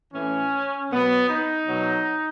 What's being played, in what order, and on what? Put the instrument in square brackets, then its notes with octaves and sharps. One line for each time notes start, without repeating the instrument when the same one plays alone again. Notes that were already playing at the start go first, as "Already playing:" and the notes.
[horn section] A2 E3 C#4
B2 F#3 B3
D#4
B2 F#3